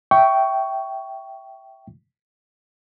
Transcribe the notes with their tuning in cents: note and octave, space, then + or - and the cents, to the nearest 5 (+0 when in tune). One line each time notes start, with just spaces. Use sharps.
E5 +0 G5 -10 C#6 +15